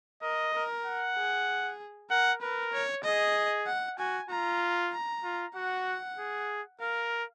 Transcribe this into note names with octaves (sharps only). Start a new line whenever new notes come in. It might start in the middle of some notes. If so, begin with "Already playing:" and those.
A#4 D#5
A#4
F#5
G#4
A#4 F#5
A#4 B4
C#5
G#4 D#5
F#5
F#4 G#5
F4 A#5
A#5
F4
F#4 F#5
G#4
A#4 F5